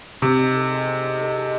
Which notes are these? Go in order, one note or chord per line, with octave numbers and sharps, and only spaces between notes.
C3 C4
D#4
A4
G#3
C4
D#4
A4
G#3